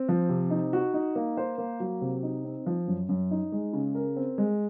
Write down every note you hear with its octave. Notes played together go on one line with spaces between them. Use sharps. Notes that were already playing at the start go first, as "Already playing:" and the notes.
Already playing: C4
F3
C3
D#4
F#4
D#4
A#3
C5
A#3
F#3
C3
D#4
C4
F3
F#2
F#2
D#4
G#3
C#3
A#4
C4
G#3